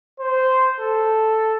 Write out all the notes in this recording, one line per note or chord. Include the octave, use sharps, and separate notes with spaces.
C5
A4